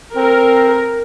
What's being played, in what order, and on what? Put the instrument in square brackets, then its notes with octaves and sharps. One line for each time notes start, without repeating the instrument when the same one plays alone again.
[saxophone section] C4 [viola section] A#4